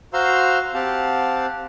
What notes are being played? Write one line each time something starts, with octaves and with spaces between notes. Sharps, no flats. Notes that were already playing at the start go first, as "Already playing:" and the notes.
F#4 C5 F5 A#5 C6 E6
C4 G4 F5 F#5 A5